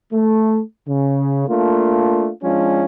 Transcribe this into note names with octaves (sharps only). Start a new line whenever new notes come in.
A3
C#3
A3 A#3 D4 F4
F3 G#3 C#4 D4 F4